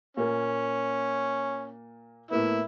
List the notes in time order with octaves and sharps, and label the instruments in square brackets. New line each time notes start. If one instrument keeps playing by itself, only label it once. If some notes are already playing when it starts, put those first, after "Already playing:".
[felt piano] A#2 A#3 [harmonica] C#4
[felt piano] A2 A#3 B3 [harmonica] E4